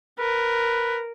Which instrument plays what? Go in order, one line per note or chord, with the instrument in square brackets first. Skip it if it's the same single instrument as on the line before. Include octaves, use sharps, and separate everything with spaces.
[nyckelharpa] A#4 [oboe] B4